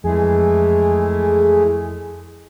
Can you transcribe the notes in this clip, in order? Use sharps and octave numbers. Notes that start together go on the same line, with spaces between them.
F2 E3 G#3 A3 G#4